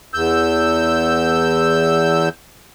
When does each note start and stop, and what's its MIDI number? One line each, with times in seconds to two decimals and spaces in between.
0.14 2.29 40
0.14 2.29 88
0.14 2.29 91